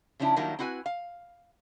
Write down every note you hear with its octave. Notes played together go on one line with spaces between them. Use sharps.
C#3 F3 C#4 D4 E4
D#3 F#3 G3 A#3 D4 E4
C4 E4 F#4 B4 G#5
F5